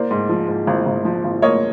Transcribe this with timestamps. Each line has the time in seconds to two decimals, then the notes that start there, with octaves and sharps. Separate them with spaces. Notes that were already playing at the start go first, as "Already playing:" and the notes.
Already playing: A#3 C5 D5
0.11 G#2
0.29 F3
0.48 G#2
0.67 G#1
0.86 G#1
1.05 F3
1.24 G#1
1.42 A#3 C#5 D#5